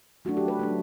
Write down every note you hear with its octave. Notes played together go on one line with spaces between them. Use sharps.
F#3 A3 D4 F#4
G4
B4
F#3 A3 D4